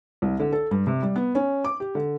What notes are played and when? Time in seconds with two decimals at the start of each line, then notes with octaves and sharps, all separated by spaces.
0.22 C2
0.39 D3
0.52 A4
0.71 G2
0.87 C3
1.02 G3
1.16 B3
1.35 C#4
1.64 D6
1.80 G4
1.95 D3